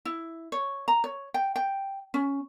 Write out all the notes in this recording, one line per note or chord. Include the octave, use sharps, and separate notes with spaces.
E4
C#5
A#5
C#5
G5
G5
C#4